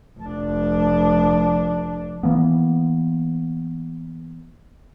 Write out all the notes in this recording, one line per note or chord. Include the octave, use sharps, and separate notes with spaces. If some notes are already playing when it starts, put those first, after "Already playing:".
F1 D4
E3 A#3 B3